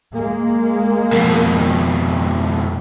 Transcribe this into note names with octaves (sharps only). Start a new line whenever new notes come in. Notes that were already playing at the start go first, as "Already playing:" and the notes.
G#3 A#3
F2 B2